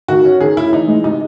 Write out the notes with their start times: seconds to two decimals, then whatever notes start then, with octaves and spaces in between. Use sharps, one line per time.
0.08 D#3 F#4
0.25 C#4
0.41 D#3 G#4
0.56 C#4 E4
0.73 E3 D#4
0.88 G#3
1.04 C3 D#4